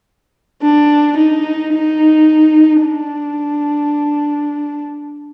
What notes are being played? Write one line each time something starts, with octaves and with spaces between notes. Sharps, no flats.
D4
D#4
D#4
D4